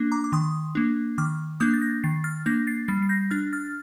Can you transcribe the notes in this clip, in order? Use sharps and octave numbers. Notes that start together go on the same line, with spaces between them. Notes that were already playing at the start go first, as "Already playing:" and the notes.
Already playing: A#3 D4
A#5 D6
D6
D#3 C6 D#6
A#3 D4
D#3 D6 F6
A#3 D4 D#6 G6
A6
G6 A#6
D#3 A6 C7
F6 A6
A#3 D4 G6 A#6
A6 C7
G3 A6 C7
C7
G6 A#6
D4 F6 A6
F6 A6